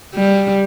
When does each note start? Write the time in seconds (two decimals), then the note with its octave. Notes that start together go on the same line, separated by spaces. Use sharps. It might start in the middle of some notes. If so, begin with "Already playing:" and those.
0.15 G3